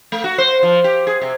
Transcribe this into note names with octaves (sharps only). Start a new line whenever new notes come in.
A3
F#4
C5
F3
G4
G#4
C3